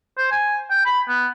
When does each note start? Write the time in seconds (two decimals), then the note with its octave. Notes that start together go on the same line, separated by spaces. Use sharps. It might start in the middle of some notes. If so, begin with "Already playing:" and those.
0.18 C5
0.31 G#5
0.70 G5
0.85 B5
1.08 B3